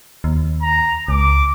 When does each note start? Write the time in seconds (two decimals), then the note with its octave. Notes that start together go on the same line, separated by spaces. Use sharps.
0.24 D#2
0.62 A#5
1.08 C#2 D6